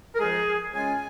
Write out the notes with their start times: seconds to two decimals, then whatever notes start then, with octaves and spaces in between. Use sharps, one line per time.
0.15 A#4
0.20 F2 F3 G#3 D#4 G#4
0.74 C#3 G#3 C#4 F4 G#5